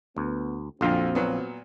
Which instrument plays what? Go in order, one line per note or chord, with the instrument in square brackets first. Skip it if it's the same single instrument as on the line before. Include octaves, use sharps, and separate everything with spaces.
[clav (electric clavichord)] D2 [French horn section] B3
[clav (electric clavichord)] A#1 F4 F5 [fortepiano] F2 D3 [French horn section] C4 F#4
[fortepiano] A#2 F#3 B3